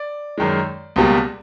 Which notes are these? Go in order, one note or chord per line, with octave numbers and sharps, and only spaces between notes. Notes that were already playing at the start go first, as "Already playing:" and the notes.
Already playing: D5
F#2 D#3 G#3
C#2 B2 G3 A#3